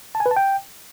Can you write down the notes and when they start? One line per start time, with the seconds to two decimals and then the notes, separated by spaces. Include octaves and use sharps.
0.15 A5
0.20 G#5
0.26 B4
0.31 A5
0.37 G5